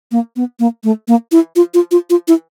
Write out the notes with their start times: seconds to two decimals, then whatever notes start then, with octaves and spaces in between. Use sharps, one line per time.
0.12 A#3
0.36 B3
0.60 A#3
0.84 A3
1.08 A#3
1.32 E4
1.56 F4
1.74 F4
1.91 F4
2.10 F4
2.28 E4